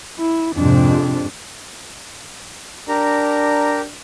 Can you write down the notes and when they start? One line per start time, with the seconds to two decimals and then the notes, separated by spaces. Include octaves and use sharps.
0.19 E4
0.55 F2 G#2 C3 D4
2.88 D4 G4 A#4 A#5